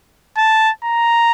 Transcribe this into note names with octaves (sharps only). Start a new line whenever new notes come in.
A5
A#5